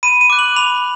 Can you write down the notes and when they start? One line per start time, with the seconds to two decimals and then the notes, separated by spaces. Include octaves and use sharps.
0.03 B5 D#7
0.21 D#7
0.30 D6 F#6
0.39 F#7
0.56 B5 F7